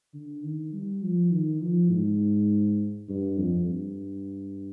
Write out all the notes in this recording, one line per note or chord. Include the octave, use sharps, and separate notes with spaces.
D3
D#3
G3
F3
D#3
F3
G#2
G2
F2
G2